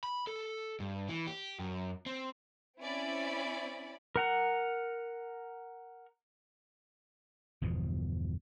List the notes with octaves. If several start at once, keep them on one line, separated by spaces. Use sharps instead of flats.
B5
A4
G2
E3
G4
F#2
C4
C4 C#4 E4 D5 B5
A#4 F#5 A#5
G1 E2 B2 F3